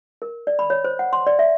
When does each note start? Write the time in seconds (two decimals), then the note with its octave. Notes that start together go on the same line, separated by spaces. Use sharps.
0.22 A#4
0.47 D5
0.59 B5
0.70 C#5
0.84 C5
0.99 F#5
1.13 C6
1.27 D5
1.39 E5